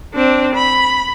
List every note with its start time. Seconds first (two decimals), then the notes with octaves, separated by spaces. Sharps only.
0.14 C4 D4
0.55 B5